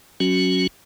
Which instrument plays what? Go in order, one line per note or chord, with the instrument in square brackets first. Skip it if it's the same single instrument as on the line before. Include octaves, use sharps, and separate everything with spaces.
[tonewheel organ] F#3 C#4 F#4